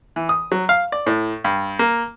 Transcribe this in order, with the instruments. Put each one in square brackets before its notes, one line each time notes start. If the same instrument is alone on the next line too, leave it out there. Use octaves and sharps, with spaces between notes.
[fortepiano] E3
D#6
F#3
F5
D5
A2
G2
A#3